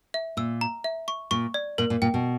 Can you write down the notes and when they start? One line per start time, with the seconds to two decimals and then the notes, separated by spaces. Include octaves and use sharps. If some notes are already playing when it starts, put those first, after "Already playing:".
0.14 E5
0.37 A#2 E6
0.61 A#5
0.84 E5
1.08 C#6
1.31 A#2 C#6
1.54 D5
1.78 A#2 A#4
1.90 A#2
2.02 A#2 G5
2.14 B2